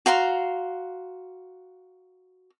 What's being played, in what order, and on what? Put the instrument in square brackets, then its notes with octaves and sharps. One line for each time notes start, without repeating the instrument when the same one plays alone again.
[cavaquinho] F#4 F5 A#5 C6